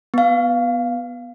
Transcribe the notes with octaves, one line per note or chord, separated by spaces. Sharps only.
B3 F5